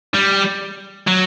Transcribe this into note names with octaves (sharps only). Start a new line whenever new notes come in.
G3
F#3